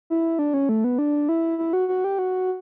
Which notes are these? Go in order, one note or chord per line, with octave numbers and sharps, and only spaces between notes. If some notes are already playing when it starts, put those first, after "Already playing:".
E4
D4
C#4
A3
B3
D4
E4
E4
F#4
F#4
G4
F#4